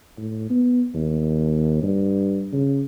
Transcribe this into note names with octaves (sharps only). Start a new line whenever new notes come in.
A2
B3
D#2
G2
C#3